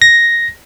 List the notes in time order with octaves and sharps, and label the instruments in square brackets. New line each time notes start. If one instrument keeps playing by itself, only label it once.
[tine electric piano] A#6